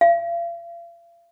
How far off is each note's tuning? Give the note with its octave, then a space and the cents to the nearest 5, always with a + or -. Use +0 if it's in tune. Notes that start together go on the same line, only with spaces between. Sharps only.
F5 -40